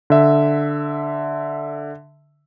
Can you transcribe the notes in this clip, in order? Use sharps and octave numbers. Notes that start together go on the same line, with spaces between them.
D3 E5